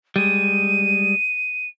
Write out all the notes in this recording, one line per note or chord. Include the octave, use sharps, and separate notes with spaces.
G3 G#3 D#7